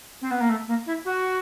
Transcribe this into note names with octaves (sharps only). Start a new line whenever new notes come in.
C4
B3
A#3
A3
A#3
E4
F#4